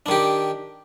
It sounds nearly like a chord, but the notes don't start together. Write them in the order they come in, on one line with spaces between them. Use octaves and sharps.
D4 D#3 G4